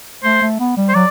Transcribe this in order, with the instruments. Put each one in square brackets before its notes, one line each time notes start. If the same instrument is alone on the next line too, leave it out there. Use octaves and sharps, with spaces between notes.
[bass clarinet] A3 [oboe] C5
[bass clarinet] A3
B3
G3
[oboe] C5
[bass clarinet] F#3 [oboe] D5